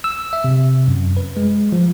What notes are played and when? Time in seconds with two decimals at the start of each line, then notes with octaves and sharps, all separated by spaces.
0.04 E6
0.33 E5
0.44 C3
0.88 F#2
1.17 B4
1.37 G#3
1.72 F3